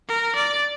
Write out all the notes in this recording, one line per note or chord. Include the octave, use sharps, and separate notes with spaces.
A#4
D5